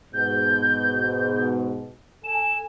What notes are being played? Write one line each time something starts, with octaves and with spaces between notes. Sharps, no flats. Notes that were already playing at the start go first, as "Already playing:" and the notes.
G#2 B2 G6
A4 G#5 E7